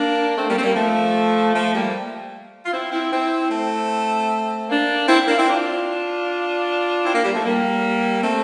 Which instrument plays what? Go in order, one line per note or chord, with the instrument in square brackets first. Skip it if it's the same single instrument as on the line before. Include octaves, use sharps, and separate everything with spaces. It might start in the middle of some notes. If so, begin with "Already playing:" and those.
Already playing: [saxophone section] A#3 D4
A3 C4
G3 A#3
C4
G3 A#3
F3 A3
F3 A3
G3 A#3
F4
C4 E4
C4 E4
C4 E4
A3 C4
A#3 D4
C4 E4
A#3 D4
C4 E4
D4 F4
C4 E4
A#3 D4
G3 A#3
F3 A3
G3 A#3
A3 C4